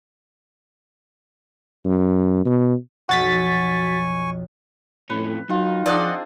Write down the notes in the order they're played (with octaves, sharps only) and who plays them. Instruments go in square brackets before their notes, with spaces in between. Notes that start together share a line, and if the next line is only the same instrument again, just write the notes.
[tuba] F#2
B2
[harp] B1 F2 F3 [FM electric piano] F#4 A6 B6 [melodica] G#5 C#6
[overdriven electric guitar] F2 C#4 [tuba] A2 [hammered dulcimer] B4
[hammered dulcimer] D#3 F4 [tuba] F#3 [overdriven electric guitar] D#4
[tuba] F3 [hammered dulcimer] C4 D4 G#4 [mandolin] D5 D#5 F#5